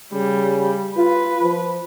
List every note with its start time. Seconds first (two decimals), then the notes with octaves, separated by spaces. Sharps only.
0.13 C#3 G3
0.97 F4 B4
1.43 F3